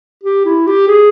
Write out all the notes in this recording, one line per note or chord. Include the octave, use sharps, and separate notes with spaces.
G4
E4
G4
G#4